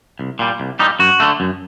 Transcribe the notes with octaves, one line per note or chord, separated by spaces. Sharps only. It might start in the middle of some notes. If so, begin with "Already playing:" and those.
C2
A#2 G3
C2
A#2 G3 D#4
F#2 F#4
D3 A3
F#2